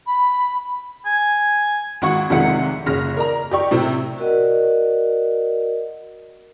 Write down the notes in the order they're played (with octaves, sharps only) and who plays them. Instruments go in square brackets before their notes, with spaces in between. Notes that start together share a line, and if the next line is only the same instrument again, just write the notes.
[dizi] B5
[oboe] G#5
[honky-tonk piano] G#1 F#4 F#5 C#6
F1 G#2 C3 D#3 F#5 C#7
F#1 C#3 F6 A#6
A#4 D5 A#5
G4 D5 C#6
A2 C3 C4
[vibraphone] F#4 A#4 D5 D#5 F#5